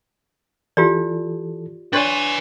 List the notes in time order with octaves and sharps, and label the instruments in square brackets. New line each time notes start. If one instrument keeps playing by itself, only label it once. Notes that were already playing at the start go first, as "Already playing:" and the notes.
[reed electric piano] E3 A4 [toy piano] F4 G4 D5
[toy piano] D4 C#5 D5 [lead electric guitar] B4 G#5 [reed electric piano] C6 C#6 A6